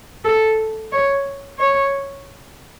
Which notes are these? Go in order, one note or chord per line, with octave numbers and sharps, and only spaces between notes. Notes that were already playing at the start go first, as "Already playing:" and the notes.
A4
C#5
C#5